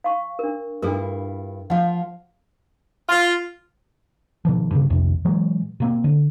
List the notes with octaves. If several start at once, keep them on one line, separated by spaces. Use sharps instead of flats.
F5 C#6
D4 A#4
G2 D4 E4 F4 A4 A#4
F3 F4 F5 F#5
F4
B2 D#3 F3
G2 C#3
B1 F2 C3
A#2 E3 F#3 G#3
B2 A#3 C4
D3